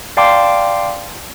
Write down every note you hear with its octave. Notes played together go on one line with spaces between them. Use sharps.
D5 F5 G5 A5 C6 D6